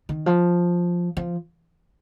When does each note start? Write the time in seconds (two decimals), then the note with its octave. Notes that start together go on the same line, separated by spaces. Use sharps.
0.09 D#3
0.26 F3
1.17 F3